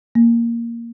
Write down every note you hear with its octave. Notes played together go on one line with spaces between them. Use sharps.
A#3